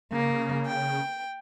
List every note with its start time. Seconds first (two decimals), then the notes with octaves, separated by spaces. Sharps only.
0.12 C#3 A#3
0.67 G5